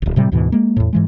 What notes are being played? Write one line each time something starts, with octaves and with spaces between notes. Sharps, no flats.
D1 G#1
A2 C3 G3
D2 G#2 B2 E3
G#3 A#3
E2 A2
G#2 E3 G#3